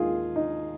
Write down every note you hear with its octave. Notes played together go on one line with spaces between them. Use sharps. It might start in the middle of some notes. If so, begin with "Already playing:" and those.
Already playing: D#2 D#3 G#3 F4 G#4
D#4